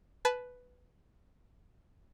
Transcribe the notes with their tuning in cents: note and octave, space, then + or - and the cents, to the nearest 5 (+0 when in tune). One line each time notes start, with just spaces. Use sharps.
B4 +5 A5 -30